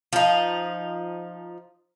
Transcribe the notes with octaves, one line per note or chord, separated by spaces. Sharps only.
F3 D#4